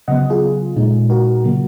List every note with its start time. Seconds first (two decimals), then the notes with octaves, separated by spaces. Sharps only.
0.08 C#3 F#3 B3 D#5 F#5
0.30 F4 G#4
0.76 A#2 G#3 D#4
1.10 F#4 A#4
1.44 C#3 F#3 A#3